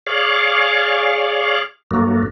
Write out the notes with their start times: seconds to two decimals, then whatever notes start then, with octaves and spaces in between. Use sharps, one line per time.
0.07 G#4 C#5 D5 F5
1.91 G2 F#3 A3 A#3